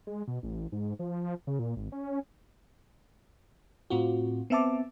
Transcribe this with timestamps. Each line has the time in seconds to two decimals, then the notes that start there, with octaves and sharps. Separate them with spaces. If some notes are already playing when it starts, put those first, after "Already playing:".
0.07 G#3
0.27 B2
0.43 A1
0.72 G#2
0.99 F3
1.47 C#3
1.59 A#2
1.77 G#1
1.92 C#4
3.90 A2 C4 F4 F#4
4.50 B3 C4 E5 A5 D6